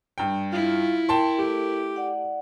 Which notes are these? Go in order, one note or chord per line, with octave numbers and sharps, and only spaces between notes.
G2 G5
E4 F4
A#4 G5 A5 C6
A3 G4
D5 F#5